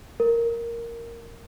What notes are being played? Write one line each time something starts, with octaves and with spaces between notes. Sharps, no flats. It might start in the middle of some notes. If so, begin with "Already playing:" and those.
A#4